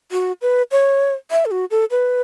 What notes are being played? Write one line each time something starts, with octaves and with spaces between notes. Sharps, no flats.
F#4
B4
C#5
E5
A4
F#4
A4
B4